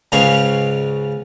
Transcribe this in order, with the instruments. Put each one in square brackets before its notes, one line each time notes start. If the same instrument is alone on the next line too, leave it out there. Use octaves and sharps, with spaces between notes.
[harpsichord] C#2 G#2 C#3 C#4 F5 C#6